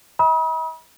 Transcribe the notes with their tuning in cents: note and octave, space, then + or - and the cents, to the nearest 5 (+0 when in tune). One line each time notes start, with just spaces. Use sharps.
D#5 +45 B5 -40 D#6 +35